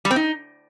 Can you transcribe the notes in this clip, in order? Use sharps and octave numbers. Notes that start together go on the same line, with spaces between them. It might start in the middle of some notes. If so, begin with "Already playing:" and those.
G3
C4
D#4